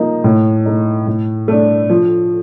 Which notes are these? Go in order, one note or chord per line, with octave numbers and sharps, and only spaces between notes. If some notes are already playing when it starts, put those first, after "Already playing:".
Already playing: F3 A#3 D#4
A2
A3 D#4
A2
A3 D4
F3